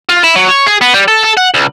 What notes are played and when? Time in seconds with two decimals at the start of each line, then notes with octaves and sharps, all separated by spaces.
0.09 F4
0.24 E4
0.36 F#3
0.49 C#5
0.67 G#4
0.81 B3
0.94 G3
1.08 A4
1.24 A4
1.37 F#5
1.54 C#2